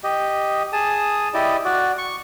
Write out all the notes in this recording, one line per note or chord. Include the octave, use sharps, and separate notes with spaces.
G4 D#5
G#4 A5 D#6
E4 G4 D5 D#5
F#4 D5
C#6